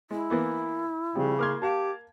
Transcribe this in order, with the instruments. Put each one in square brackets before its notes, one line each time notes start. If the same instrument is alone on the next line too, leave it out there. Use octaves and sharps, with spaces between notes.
[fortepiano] G#3 [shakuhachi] E4
[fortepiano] E3 A#3 B3
[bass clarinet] C#3 [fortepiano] F3 [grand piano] G3 C4
[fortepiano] A#3 C6 [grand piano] D6 F6 G#6
[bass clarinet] G4 [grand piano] F5 A5